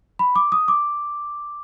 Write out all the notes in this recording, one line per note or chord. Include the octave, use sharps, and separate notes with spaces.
B5
D6
D#6
D6